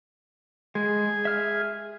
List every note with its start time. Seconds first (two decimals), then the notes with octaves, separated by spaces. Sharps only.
0.75 G#3 G#4
1.25 E5 F6